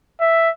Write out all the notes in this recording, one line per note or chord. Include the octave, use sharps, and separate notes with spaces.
E5